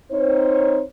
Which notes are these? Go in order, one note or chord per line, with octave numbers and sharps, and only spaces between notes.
C4 D#4 C5 C#5